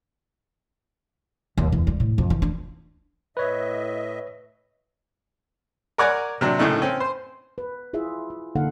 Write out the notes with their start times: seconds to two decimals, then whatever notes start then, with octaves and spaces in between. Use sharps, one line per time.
1.57 D#2
1.72 E2
1.87 G3
2.00 A2
2.18 F2
2.30 E3
2.42 D4
3.37 A2 B4 C#5 D#5 E5
5.98 A#4 C#5 D5 F#5 G#5 A#5
6.41 C3 F#3 D4
6.58 A#1 A2 C#3 A3 D#4
6.82 C4 C#4
7.00 C5
7.58 B4
7.93 E4 F4 G#4 E5
8.30 F4
8.55 D3 A#3 D#4 A4 F5 F#5